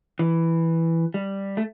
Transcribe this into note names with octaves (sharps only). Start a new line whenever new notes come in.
E3
G3
A3